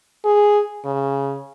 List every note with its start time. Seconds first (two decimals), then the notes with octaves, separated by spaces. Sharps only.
0.25 G#4
0.85 C#3